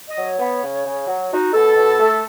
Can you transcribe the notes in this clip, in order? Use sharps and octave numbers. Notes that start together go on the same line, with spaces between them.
D#5
F#3
C#5
B3
C#3
C#3
F#3
D#4 F#4
B2 A4
B2
A3